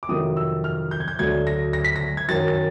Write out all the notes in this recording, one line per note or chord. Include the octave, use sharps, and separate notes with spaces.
D6
F2 C3 D#3 F#3 D#6
E6
F6
G6
G#6
G6
D2 D3 F#3 G#6
A#6
A#6
B6
A#6
G#6
F#2 D#3 F#3 A6
A6